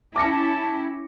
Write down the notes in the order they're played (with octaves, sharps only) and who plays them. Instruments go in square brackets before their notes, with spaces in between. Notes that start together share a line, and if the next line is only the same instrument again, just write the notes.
[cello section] C#4 E4 G4 [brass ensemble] A5 [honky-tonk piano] D6 A#6 C#7